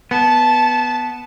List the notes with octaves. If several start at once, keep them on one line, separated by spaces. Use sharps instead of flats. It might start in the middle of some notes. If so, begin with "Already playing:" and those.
B3 A5